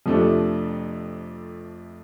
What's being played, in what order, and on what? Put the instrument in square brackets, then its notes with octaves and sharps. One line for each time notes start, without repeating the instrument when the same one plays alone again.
[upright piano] F2 C3 F3 A3 D4